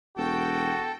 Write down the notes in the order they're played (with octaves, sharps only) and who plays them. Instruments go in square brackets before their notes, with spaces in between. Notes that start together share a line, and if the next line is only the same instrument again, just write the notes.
[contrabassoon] E1 [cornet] F#4 [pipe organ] A4 [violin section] G5